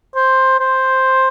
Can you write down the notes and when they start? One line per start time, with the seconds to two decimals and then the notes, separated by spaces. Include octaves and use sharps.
0.15 C5
0.60 C5